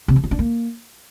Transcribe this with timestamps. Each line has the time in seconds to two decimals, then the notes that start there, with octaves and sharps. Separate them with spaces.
0.08 C3
0.16 F3
0.24 E4
0.31 D4
0.39 A#3